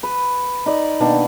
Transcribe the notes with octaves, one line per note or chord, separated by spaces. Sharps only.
B4
D#4 D5
B2 D#3 A#3 D4